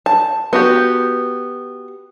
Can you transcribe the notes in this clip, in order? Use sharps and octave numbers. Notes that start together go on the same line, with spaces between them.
A5
B3 F#4 G4